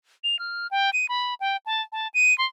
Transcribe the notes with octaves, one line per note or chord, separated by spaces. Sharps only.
F7
F6
G5
D#7
B5
G5
A5
A5
D#7
C6